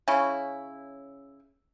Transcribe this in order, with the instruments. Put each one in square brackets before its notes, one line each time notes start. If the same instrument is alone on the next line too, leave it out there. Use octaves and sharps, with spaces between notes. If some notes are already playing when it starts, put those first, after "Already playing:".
[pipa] C#3 C#4 E4